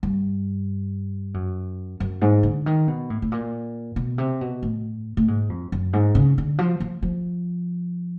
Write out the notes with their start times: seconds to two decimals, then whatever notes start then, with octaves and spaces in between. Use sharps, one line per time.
0.03 G2
1.34 F#2
2.00 F#2
2.21 G#2
2.43 D3
2.66 D#3
2.88 B2
3.10 A2
3.22 A2
3.32 A#2
3.96 B2
4.18 C3
4.41 B2
4.63 A2
5.17 A2
5.28 G#2
5.49 F2
5.72 F#2
5.93 G#2
6.15 C#3
6.38 D3
6.59 F3
6.80 F3
7.03 F3